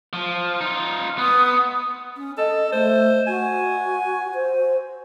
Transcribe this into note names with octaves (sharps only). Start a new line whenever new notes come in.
F3
D#4 F4
B3 D#6
C#4
A4 D#5
A3 C5
F#4 G#5
C5